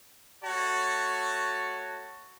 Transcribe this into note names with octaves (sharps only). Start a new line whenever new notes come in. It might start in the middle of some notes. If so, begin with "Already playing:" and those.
A3 F#4 C#5 A5